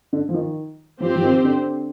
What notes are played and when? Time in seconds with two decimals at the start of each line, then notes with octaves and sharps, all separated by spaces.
0.13 D3
0.29 F3
0.34 D#3
1.00 F3 C4 G4 C5
1.16 F3
1.23 D#3
1.45 D3